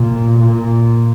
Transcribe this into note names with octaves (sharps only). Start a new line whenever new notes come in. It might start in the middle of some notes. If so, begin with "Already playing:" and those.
Already playing: A#2
A#2